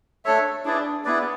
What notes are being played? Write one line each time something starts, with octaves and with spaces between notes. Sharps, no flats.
A3 D4 A4 C#5 E5
D4 E4 G#4 B4 D5
B3 E4 G#4 B4 D5